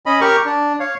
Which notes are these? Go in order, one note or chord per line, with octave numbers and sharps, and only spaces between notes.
C#4 D#5 B5
G4 A#4 C#6
D4
C#5 F5